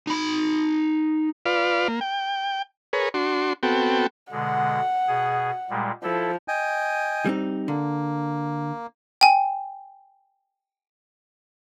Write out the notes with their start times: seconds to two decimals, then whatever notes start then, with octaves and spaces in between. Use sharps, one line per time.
0.07 D#4 B5
1.46 F4 B4 D5 F5
1.88 A#3
2.01 G5
2.93 G#4 A#4 B4 C#5
3.14 D4 F#4 C6
3.63 B3 C4 F#4 A4 G5
4.32 B2 D3 G#3 F#5
5.08 B2 G#4
5.70 A#2 G3 G#3
6.03 F3 E4 A4
6.48 D#5 G5 G#5
7.26 G3 C4 D#4
7.68 D3 A#3
9.21 G5 G#5